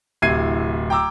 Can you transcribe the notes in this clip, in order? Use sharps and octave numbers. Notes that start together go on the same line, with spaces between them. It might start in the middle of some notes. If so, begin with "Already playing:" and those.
D1 C3 E4 G#6 C7 D#7
G5 A#5 D6 E6